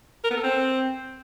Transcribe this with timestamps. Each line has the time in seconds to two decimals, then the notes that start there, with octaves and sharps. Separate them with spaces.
0.24 A#4
0.31 B3
0.37 A4
0.43 C4